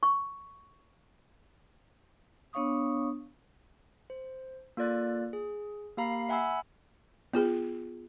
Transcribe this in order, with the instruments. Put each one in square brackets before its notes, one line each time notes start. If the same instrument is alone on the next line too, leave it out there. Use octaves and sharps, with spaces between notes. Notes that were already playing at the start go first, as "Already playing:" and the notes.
[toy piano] C#6
[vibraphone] B3 D4 C#5 F5 C#6 D#6
[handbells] C5
A#3 F4 A4 D5 F#6 A6
G#4
A#3 G4 F5 A#5 B5 C7
E5 F#5 G#5 B5 E6
[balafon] B3 F4 G#4